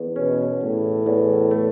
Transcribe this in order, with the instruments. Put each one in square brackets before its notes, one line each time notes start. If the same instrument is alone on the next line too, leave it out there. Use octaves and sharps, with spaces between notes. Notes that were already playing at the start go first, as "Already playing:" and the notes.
Already playing: [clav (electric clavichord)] E2
[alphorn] B2 [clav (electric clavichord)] C#4
[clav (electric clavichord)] E2 [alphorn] A2
[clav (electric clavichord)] E2
A3